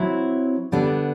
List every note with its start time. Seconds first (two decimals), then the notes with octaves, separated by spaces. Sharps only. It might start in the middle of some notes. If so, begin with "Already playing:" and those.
Already playing: F#3 C4 E4
0.72 D3 G3 B3 D4